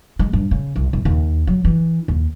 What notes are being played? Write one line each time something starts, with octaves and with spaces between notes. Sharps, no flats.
G#3
G2
C#3
C2
C2
D#2
F#3
E3
D#2